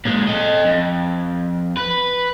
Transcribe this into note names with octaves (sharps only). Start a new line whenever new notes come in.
A#2 G#3
A4 D#5
F2
B4